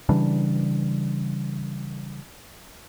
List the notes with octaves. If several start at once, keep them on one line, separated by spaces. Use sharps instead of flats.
C#3 E3 G3 D4